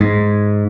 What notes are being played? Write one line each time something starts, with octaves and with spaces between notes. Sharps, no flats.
G#2